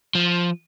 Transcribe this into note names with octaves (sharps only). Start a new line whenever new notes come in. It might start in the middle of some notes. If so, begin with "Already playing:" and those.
F3